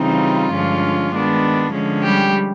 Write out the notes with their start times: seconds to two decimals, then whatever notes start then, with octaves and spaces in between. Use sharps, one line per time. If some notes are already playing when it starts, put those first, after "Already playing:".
Already playing: C#3 E3 G3 C4 D#4 F4
0.52 G2 D3 F3 G#3 C#4
1.14 D#3 G#3 B3 D4
1.74 D3 F3 G#3 C#4
2.04 G3 G4